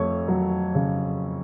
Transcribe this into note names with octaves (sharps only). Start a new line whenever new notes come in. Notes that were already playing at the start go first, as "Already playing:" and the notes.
Already playing: F2 A3 C#5
F#3
C#3